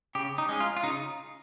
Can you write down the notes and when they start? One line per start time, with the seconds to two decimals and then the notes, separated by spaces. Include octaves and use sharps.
0.15 C#3 G4
0.38 D#4
0.49 G#3 C#4
0.60 F4
0.77 F4
0.83 C#3 D#4